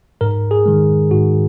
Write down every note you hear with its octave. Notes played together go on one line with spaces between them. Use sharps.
G#2 A#4
G#4
D#3 G#3
G#2 F#4